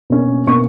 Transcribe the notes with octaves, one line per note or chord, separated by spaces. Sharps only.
B2 A#3 C#4
B2 A#3 C#4 C#6